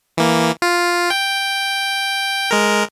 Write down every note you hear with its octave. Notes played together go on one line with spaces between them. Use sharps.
E3 A#3
F4
G5
G#3 A#4